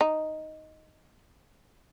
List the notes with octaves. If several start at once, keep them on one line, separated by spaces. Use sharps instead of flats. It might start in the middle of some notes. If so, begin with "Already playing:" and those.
D#4